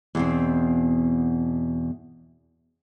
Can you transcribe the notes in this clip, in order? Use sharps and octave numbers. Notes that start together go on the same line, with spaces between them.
E2 B2 C4